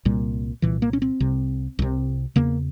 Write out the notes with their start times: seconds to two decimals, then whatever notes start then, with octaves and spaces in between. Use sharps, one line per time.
0.05 C2 A#2 G3
0.62 C2 A#2 E3
0.82 A#3
0.93 C#4
1.02 C4
1.20 C2 C3
1.79 C2 C3
2.36 E2 C#3 A#3